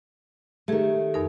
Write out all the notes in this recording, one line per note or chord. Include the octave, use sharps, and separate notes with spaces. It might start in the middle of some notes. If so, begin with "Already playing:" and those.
D#3 A3 G4 G#4
F2 D#4 A#4